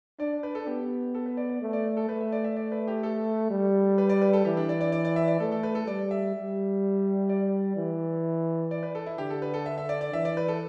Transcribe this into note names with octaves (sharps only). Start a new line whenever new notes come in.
D4 D5
B4
A4
B3 G4
A4
B4
D5
D5
A3
D5
A4
A3 B4
E5
D5
E5
D5
B4
G4
A4
G3
B4
D5
B4
A4
E3 G4
D4
D5
D5
D5
D5
E5
D5
A3 A4
A4
B4
A4
G3 D5
E5
G3
D5
E3
D5
B4
A4
E4
D3 G4
A4
B4
A4
E5
E5
D5
D5
E3 E5
D5
B4
A4